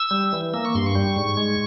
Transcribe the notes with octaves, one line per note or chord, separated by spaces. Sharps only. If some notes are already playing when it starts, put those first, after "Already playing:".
Already playing: E6
G3
E3
A#3 E6
C#6
G2 C6
C#6
G3
G#2
G#3